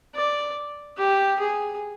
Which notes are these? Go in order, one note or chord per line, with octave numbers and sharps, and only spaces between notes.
D5
G4
G#4